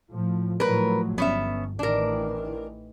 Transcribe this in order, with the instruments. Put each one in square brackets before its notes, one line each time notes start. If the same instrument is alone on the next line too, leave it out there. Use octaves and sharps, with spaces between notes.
[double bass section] A2 F3
[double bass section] A2 F3 F#3 [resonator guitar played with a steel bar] A#4 B4
[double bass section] G1 [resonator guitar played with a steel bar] B3 C#4 E5
[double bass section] A1 D#3 E3 [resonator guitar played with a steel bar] D4 A#4